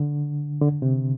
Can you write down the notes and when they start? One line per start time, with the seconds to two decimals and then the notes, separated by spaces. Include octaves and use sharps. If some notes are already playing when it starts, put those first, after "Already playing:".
Already playing: D3
0.61 D3
0.82 C3